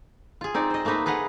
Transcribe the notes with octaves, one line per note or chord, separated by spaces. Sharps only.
F4 G#4
C4 D#4 D5
C5 D#5
A3 A#3 C4 D#4 B4
G#4 B4 D#5 F5 F#5